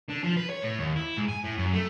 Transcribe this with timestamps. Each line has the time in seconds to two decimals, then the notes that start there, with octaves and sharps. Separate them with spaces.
0.10 D3
0.24 F3
0.37 B4
0.50 C#5
0.62 A2
0.79 D#2
0.97 E4
1.17 G#2
1.28 G#5
1.44 A2
1.58 F#2
1.73 A3